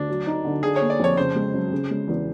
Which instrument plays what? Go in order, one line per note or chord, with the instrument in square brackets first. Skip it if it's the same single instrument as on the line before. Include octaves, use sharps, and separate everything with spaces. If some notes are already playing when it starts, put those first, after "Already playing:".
Already playing: [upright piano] D2 [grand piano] D4
[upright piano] F#3
D#4
D3
[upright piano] D3 [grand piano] G#4
[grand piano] C#5
[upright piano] A#3
[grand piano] D5
[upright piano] F2 [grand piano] C#5
[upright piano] C#3 [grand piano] C5
[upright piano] G#3
F#2
C#3
G#3
E2